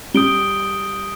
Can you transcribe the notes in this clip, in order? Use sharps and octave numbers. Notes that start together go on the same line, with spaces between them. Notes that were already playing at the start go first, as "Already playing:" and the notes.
G3 D#6 G6 D7 G7